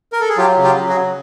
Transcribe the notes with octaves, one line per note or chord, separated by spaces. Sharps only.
A#4
A4
G#4
F#3 F4 G4
C#3
F4 G4
F#3
F#4 G#4
C#3